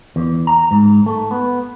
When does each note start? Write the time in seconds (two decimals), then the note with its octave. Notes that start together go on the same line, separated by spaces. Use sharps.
0.16 E2
0.47 A#5
0.71 G#2
1.06 A3
1.31 B3